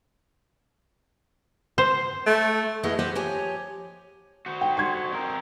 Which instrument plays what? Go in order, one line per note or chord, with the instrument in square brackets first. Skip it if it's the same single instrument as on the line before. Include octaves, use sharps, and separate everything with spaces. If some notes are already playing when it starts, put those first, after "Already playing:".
[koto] C5
[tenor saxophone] A3
[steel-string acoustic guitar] A3 E4 G#4 B4 D#5 F#5
G4 B4 C5 F#5
F3 G4 C#5 G#5
[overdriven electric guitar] F#4 C5
[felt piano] G5
C6 C#6 G#6
[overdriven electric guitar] C4 A#4